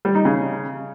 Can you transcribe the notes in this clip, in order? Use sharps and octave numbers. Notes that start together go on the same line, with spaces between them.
G3
D#4
C#3